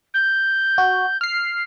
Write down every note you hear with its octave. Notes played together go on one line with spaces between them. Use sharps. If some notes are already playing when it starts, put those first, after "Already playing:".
G6
F#4
F6 C7